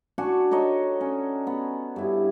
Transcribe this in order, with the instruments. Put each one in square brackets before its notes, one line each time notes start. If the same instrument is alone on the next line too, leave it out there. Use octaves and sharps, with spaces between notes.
[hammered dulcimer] D4 F#4 G#5 C#6
D#4 A4 C#5 D#5
C#4
B3
G2 E4